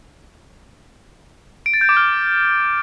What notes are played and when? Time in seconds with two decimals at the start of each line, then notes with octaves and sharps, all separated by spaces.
1.66 D7
1.74 A6
1.81 G6
1.89 D6
1.97 F6